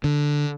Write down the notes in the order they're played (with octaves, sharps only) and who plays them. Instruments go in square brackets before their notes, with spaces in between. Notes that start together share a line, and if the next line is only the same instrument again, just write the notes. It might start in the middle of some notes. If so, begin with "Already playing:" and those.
[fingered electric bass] D3